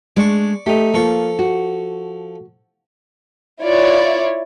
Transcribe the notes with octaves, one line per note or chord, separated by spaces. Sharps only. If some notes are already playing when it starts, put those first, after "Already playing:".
G#3 A3 D4 D5 C#6
A3 D#4 G4
F3 A#3 F4 A4 C#6
F#4
E4 F4 C#5 D5